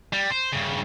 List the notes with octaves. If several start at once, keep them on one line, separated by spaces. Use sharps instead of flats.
G3
C5
G2 C#3